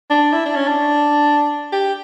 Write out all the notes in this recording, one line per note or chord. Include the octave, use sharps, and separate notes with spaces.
D4
E4
D4
C#4
D4
G4